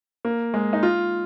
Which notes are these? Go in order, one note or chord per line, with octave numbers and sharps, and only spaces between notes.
A#3
G#3
D#4
F4